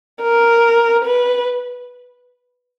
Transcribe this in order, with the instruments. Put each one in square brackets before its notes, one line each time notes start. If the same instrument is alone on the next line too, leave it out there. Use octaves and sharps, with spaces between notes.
[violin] A#4
B4